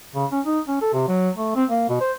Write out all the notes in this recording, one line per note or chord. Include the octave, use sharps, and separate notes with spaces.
C#3
C#4
D#4
C#4
A4
C3
F#3
A3
C4
A#3
B2
C5